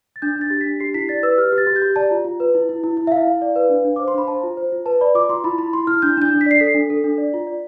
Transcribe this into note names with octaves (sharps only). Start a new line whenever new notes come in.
A6
D4 G6
D4
A6
G4
D4 B6
G4 C7
E4 B6
D5 A6
B4 E6
G4 F6
G4
A6
G4
G6
G4
D5 A5
F4
F4
B4
E4
E4
E4
E4
E5
E4 F5
E4
D5
B4
D4
D4
C5 D6
C6
D4 B5
C5 A5
F4
C5
F4
B4 A5
D5 B5
F4 D6
F4 C6
E4 B5
E4 B5
E4 C6
E4 F6
D4 G6
D4 G6
D4
B6
D5 C7
A4 B6
D4
A4
D4
D5
F4
D5